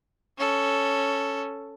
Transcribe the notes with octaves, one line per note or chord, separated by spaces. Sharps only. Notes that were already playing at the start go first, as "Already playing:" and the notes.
C#4 A4